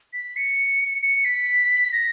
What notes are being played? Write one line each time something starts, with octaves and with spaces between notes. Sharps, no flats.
B6
C#7
C#7
B6
A#6